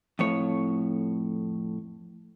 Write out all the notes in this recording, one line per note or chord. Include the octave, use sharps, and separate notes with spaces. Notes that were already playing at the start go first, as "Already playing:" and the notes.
F2 A2 C#5